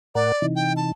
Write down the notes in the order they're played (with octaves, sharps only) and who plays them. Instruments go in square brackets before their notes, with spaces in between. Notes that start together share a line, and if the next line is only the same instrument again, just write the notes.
[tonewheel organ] A2 A#4 F#5 [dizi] D5
[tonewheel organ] C3 E3 D#4
[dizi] G5
A5